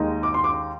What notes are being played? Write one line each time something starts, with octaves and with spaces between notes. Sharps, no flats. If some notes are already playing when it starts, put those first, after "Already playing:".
Already playing: D#2 D#3 G#3 D#4 D#5
D6
C6
D6